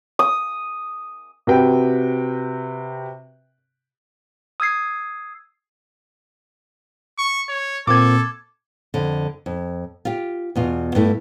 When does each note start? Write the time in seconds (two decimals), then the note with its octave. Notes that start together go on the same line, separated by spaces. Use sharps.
0.19 D#6
1.47 C3 F#4 B4 G5
4.60 D#6 E6 G#6 C7
7.18 C#6
7.49 C#5
7.87 A#2 A#3 C4 A4 D6 G#6
8.94 F2 D3
9.46 F2
10.05 F4 G4
10.55 E2 B2 F4
10.95 G2 A3 E4